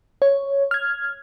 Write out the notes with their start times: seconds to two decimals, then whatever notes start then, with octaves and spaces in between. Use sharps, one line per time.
0.22 C#5
0.71 F6 G#6